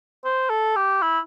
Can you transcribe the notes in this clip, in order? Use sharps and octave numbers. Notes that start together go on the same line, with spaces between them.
C5
A4
G4
E4